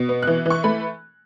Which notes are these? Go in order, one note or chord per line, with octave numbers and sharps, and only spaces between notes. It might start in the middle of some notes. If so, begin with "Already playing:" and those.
Already playing: B2
B3
F#6
E3
E3 C#6
A3 B5